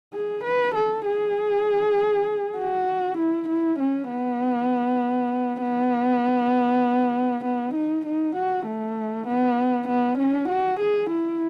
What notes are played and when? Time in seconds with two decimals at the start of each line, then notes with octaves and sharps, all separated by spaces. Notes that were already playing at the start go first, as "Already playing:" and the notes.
0.14 G#4
0.44 B4
0.75 A4
1.05 G#4
2.58 F#4
3.18 E4
3.49 E4
3.79 C#4
4.10 B3
5.62 B3
7.45 B3
7.75 D#4
8.06 D#4
8.36 F#4
8.66 A3
9.27 B3
9.88 B3
10.18 C#4
10.49 F#4
10.80 G#4
11.10 E4